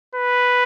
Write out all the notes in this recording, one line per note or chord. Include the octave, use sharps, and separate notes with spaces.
B4